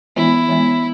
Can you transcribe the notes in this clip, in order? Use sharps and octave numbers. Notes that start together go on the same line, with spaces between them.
E3 G#3 B3 E4
E3 G#3 B3